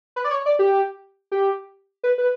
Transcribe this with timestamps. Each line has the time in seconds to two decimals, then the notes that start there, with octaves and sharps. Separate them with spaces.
0.16 B4
0.24 D5
0.31 C#5
0.46 D5
0.59 G4
1.32 G4
2.04 B4
2.18 B4